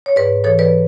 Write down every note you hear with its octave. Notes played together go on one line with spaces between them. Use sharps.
C#5
G#2 B4 D5
E3 A4 C#5
B4 D5